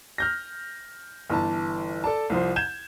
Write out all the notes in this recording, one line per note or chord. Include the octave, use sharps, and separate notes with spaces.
F6 G6 A#6
G1 E3 A5
A4 D5 A5
C2 F3 C5
G6 G#6 E7